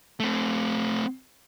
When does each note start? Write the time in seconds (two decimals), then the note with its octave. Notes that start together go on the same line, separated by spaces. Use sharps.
0.20 A3 C4